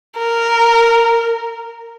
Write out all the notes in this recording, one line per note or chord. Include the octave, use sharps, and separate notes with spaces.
A#4